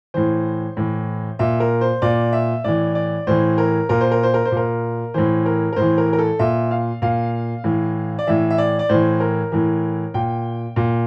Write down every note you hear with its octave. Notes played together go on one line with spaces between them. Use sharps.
A2 E3 C5
A2 E3
A#2 E5
A#4
C5
A#2 D5
E5
A2 E3 D5
D5
A2 E3 C5
A#4
A#2 A#4
C5
A#4
C5
A#4
C5
A#2
A#4
A2 E3 C5
A#4
A#4
A2 C5
E3
A#4
A#4
A4
A#2 E5
F5
A#2 F5
A2 E3
D5
A2 E3 E5
E5
D5
D5
A2 E3 C5
A#4
A2 E3
A#2 G5
A#2